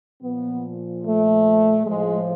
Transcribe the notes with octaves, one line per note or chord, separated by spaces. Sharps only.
A#2 F3 B3
A3
A2 F3 G#3